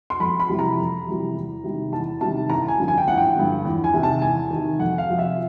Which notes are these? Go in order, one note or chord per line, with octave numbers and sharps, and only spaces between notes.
C6
F2 B5
B5
C3 E3 G3
A#5
F2
C3 E3 G3
E2
C3 D#3 G3
E2 A5
C3 D#3 G3 A5
A1 A#5
G#5
G2 D3 F3
G#5
G5
A1 F#5
G5
G2 D3 F3
E2
G#5
C3 D#3
A5
E2 G#5
C3 D#3
F2 F#5
F5
C3 F3
E5